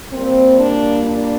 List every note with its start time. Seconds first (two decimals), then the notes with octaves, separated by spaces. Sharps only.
0.12 A#2 G3 A#3 C4
0.58 D4
1.03 D4